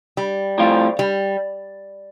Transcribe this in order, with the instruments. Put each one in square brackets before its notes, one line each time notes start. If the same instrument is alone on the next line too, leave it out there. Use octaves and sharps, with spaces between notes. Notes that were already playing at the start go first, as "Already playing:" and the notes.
[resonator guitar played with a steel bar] G3
[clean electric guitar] A2 F3 C4 F4
[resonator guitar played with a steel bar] G3